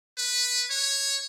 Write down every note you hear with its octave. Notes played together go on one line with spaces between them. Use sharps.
B4
C#5